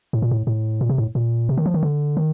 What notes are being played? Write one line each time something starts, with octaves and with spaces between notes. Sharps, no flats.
A2
A#2
A2
A2
A#2
C3
A2
A#2
C3
D#3
F3
D#3
D3
D#3